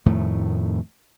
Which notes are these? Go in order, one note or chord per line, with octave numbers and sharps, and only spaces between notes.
F2 A2 D#3 A3